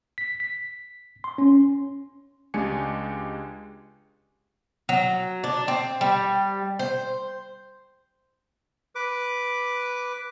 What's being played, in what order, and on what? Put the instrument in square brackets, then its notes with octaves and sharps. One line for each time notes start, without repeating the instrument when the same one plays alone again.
[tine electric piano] B6
B6
C6
C#4
[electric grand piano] C#2 G#3 D4 G4 G#5 C#7
[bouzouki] F#3
D4
C4
G3
C5
[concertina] B4 D6